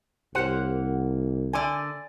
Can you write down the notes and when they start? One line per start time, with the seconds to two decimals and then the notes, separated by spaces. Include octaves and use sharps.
0.35 C2 A#3 G4 C5 F#5
1.53 D3 D5 G#5